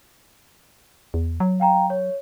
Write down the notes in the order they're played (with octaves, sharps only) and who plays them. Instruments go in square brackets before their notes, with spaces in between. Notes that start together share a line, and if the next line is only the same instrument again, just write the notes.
[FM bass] E2
F#3
[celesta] F5 G5 A#5
C#5